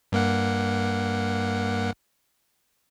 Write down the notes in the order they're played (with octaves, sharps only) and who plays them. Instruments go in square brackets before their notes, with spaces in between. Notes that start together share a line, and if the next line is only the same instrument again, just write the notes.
[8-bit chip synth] G2 A#3 F#5